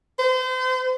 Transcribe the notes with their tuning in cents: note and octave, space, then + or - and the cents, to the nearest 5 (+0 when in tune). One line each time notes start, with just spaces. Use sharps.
C5 -35